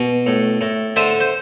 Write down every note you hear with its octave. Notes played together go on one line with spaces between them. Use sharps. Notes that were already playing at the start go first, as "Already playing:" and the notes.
Already playing: B2
A2
A2
D3 C5 E5
C5